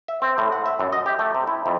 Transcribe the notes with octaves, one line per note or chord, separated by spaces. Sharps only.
E5
C4
A2
F#5
E5
F#2
D#5
G4
A3
C3
E4
F2